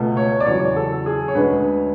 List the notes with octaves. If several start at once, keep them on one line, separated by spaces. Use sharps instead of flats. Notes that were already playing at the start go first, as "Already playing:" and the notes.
Already playing: C#2 B2 A3
C#5
D5
E2 C#3 F#3 C#5
A4
G#4
C#5
D2 D3 G#3 C#4 B4